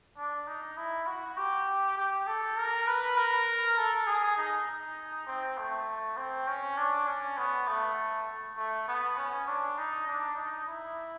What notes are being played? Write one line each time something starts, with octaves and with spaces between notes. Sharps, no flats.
D4
D#4
E4
F#4
G4
G4
A4
A#4
B4
A#4
A4
G#4
D#4
D#4
C4
A3
C4
C#4
D4
C#4
B3
A3
A3
B3
C#4
D4
D#4
D4
D#4
E4